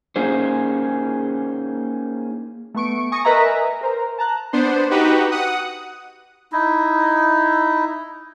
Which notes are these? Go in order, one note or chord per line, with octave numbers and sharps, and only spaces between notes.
A#3 C#4 D#4 G#4 C5
A3 B3 C#6 D7
G#5 C#6 D#6 A#6
A#4 B4 D#5 E5 G#5 A#5
A#4 C5 A#5
A5 A#5 F#6
B3 D4 C5
D#4 F#4 G4 B4
F#5 D#6
D#4 E4